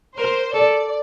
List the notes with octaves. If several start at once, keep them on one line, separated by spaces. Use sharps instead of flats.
A#4 C5
A4 D5